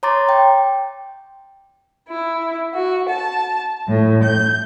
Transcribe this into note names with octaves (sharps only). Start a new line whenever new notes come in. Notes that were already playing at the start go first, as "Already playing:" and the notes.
C#5 A#5 C6 D6 A6
G5
E4
F#4
A5
A2
G6